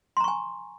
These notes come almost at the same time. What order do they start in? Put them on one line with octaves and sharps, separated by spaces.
C6 A#5 C#6 G#5